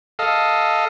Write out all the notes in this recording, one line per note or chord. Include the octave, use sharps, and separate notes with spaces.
A4 D#5 F5